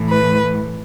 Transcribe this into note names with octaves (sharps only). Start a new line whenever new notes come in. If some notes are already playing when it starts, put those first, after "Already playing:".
Already playing: A2 E3
B4